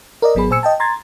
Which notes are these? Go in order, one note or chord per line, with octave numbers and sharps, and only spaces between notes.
A#4 D5 D#5
G#1 F#3 B3 G#4 B5
A#2 C5 G#5 E6 C#7
D#5 G5 A5
A#5 C6 G#6 A6